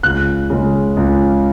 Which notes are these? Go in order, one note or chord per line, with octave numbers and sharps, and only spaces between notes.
C#2 F#6
C#3 G#3
C#2